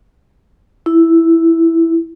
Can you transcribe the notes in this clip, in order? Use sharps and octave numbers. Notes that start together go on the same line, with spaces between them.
E4